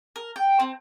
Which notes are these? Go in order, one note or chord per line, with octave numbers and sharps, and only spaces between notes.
A#4
G5
C4